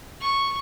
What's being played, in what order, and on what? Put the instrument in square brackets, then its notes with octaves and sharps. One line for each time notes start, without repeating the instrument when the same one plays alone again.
[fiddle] C#6